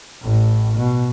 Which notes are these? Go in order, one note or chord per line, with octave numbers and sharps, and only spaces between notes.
A1 A2
B2